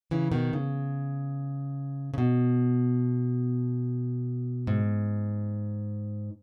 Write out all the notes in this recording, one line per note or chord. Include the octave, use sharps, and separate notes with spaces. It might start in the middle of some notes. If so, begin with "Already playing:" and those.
C#3 E3
B2 D#3
C#3
C#3
B2
G#2